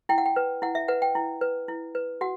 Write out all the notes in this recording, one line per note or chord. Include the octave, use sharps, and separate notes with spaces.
E4 G5
F#5
G5
B4
E4 F#5
E5
B4 F#5
G5
E4
B4
E4
B4
F#4 F#5